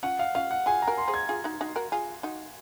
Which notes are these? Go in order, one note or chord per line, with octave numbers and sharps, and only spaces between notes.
C#4 F4 F#5
F5
C#4 F4 F5
F#5
F4 G#4 G#5
A#5
F#4 A#4
C6
G#4 C5
G#6
F4 G#4
D#4 F#4
D#4 F#4
F#4 A#4
F4 G#4
D#4 F#4